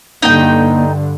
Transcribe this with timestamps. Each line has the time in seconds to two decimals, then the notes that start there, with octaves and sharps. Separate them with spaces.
0.22 G2 D3 A#3 D#4 G5